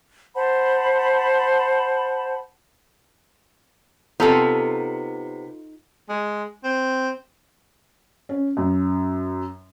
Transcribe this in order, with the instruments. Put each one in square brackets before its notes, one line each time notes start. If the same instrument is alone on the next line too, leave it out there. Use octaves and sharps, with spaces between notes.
[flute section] C5 F#5 A5 B5
[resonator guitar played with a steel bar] C3 B3 [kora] D#4 A4 [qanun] F4
[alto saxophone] G#3
C4
[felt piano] C#4
F#2